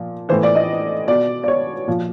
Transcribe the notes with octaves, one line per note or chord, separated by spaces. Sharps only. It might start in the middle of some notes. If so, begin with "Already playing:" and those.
Already playing: A#2 F3
A2 E3 C5
D5
D#5
B2 D5
D5
C#5
A#2 F3